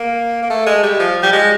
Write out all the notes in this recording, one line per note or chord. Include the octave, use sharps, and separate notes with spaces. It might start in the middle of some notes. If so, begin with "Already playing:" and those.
Already playing: A#3
A#3
A3
G#3
G3
F3
G3
G#3